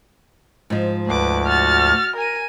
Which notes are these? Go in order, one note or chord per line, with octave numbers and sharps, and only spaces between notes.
G#2 F3
D2 B4 D6
F#4 F6 A6
A#4 G#5 D#7